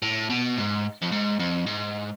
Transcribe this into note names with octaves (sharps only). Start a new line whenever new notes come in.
A2
B2
G#2
F2
G#2
F2
G#2